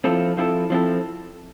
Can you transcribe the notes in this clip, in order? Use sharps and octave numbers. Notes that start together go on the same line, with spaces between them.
F3 C4 E4 A4
F3 C4 E4 A4
F3 C4 E4 A4